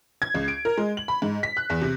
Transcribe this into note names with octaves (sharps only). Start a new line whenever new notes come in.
G#6
C#2
D7
A#4
G#3
F#7
B5
G#2
B6
F#6
E2
C3